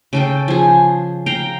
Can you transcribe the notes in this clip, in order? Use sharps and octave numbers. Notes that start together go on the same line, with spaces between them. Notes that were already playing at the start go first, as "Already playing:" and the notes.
C#3 A4 G5
F3 G#4
F5 G5 A#5